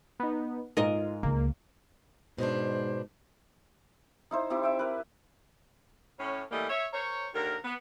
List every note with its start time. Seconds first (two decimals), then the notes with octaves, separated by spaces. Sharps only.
0.20 B3 D#4
0.77 G#2 F4 A#4 D#5
1.23 C#2 A#3
2.39 G#2 B2 D4 C5
4.31 D#4 E4 C5
4.50 C4 D#4 E4 G4
4.63 E5 G5
4.79 A#4 B4
6.19 A2 C#4
6.51 E3 G3 A3 A#3 D#5
6.69 C#5 E5
6.93 A#4 C5 C#5
7.34 D#2 D3 A#4
7.64 B3